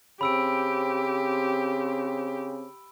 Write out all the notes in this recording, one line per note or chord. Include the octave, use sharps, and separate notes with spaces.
C#3 C4 G4 B5 E6 D7